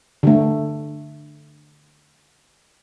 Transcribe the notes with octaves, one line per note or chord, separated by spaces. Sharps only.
D3 A3